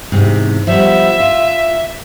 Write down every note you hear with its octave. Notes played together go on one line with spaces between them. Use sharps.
E2 G#2 C3
F3 G3 B3 E5
F4